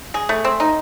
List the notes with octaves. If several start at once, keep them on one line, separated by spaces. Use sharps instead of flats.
G#4
A3
C4
D#4